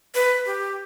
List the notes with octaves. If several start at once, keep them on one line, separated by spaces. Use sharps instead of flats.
B4
G4